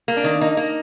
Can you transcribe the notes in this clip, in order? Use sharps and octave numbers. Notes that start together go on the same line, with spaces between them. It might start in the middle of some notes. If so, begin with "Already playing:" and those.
A#3
D4
D#3
A#3 D#4
A#3